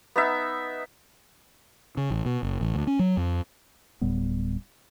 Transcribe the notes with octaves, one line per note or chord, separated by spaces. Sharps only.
B3 D#4 E5
C#3
A1
B2
F#1
A1
D2
C#4
F#3
F2
D1 A2 G3 B3